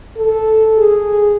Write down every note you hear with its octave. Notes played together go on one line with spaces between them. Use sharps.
A4
G#4